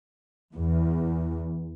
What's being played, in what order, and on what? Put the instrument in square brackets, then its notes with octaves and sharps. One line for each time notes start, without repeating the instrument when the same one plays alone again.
[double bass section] E2